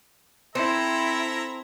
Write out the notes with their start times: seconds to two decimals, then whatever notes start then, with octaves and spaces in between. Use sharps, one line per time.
0.55 C4 E4 A4 E5 A#5